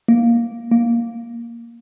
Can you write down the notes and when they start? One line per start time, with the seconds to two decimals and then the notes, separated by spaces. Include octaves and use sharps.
0.08 A#3
0.71 A#3